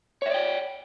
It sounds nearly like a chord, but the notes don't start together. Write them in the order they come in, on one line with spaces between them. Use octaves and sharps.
C#5 E5 D5 G5